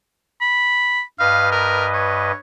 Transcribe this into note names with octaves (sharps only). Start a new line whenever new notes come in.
B5
G2 B4 D#5 F5
A#4
C#5